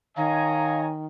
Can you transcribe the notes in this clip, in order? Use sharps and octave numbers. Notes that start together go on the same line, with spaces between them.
D#3 C#5 D#5 F5 G#5 A#5